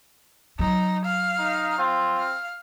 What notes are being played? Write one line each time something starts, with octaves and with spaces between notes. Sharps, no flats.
F#3 D#4
F5
D#4
C4 F4
F5